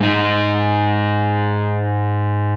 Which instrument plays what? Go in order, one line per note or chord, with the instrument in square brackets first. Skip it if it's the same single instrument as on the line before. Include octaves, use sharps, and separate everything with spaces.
[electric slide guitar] G#2 D#4